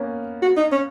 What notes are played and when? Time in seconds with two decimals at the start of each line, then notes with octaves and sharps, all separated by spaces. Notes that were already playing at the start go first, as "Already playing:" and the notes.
Already playing: A#3 B3 C#4
0.42 F#4
0.57 D#4
0.72 C#4